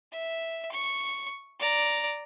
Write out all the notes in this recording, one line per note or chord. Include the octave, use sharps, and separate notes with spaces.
E5
C#6
D5 A#5